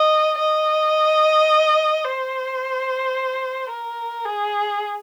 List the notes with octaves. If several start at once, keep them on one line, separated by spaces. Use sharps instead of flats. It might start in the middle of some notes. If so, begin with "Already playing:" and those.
Already playing: D#5
D#5
C5
A#4
G#4